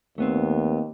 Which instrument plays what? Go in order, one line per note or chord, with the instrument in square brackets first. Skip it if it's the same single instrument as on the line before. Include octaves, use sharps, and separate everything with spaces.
[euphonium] D#2 [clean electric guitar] A3 B3 C4